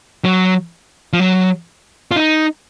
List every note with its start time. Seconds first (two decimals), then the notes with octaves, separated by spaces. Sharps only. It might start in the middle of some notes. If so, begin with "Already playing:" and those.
0.25 F#3
1.13 F3
1.20 F#3
2.11 F4
2.16 D#4